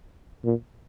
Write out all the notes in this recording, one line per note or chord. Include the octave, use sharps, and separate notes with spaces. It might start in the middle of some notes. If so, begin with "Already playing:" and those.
A#2